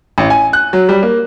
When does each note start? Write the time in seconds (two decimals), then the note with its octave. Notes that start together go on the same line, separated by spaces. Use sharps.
0.18 A1
0.30 G#5
0.53 F#6
0.73 F#3
0.89 G3
1.03 A#3